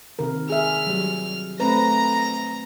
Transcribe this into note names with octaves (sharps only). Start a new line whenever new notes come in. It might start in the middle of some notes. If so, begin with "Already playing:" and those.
C3 D#3 A#4
G#4 E5 F6
F#3 G3
A3 C4 B4 A#5 A#6